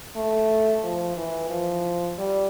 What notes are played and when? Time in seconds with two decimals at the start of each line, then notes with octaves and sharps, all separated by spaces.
0.16 A3
0.83 F3
1.17 E3
1.50 F3
2.18 G3